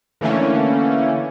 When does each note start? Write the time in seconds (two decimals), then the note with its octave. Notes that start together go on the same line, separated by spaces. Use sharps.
0.21 D3 E3 A3 A#3 C#4